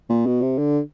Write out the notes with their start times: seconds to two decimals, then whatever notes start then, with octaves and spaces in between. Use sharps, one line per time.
0.09 A#2
0.26 B2
0.42 C3
0.58 D3